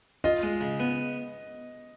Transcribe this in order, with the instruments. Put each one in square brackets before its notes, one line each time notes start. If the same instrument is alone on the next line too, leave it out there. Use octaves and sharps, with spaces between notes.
[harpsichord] F4 [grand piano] D#5
[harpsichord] G#3
C#3
B3